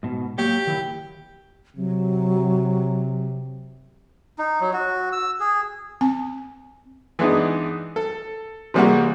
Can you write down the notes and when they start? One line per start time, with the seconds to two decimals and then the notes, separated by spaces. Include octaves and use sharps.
0.03 G#2 B2
0.38 F#3 A#3 G4 C#5
0.67 D#3 F#3 E4
1.76 C3 F#3
4.38 D#4
4.61 F#3
4.73 F#4
5.12 E6
5.40 G#4
6.01 C4 G#5
7.19 E3 G#3 B3 D4 D#4
7.96 A4
8.74 C3 E3 G3 G#3 A#3 F#4